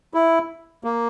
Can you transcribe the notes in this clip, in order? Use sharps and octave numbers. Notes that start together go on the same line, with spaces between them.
E4
A#3